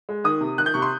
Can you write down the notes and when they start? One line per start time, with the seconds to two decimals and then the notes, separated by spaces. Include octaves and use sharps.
0.09 G#3
0.24 D#3 D#6
0.41 C3
0.58 D#3 F#6
0.66 G6
0.74 C3 C#6
0.82 C6